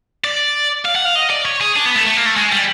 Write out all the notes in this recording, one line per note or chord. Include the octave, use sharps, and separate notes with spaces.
D5
F5
F#5
F5
D#5
D5
C#5
G#4
D4
B3
A3
A3
A#3
A3
G#3
G3